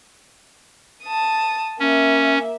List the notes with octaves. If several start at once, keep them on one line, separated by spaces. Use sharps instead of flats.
A5 D#6
A#3 C#4 E5